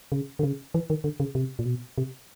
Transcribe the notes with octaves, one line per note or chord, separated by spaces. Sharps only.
C#3
D3
C#3
E3
D#3
D3
C#3
C3
A#2
B2
C3